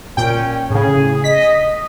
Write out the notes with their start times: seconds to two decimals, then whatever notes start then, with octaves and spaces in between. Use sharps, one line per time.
0.17 A#2 C#4 G5
0.70 A2 C#3 G#4
1.24 D#5 B6